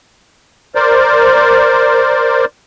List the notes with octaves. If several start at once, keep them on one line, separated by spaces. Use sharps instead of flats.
A#4 C5 D5